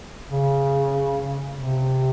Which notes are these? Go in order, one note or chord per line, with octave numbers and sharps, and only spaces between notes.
C#3
C3